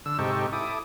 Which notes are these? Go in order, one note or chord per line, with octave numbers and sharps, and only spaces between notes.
D3 E6
G#2 C3 D#4 G4 A4 C#6
E4 A4 D6 D#6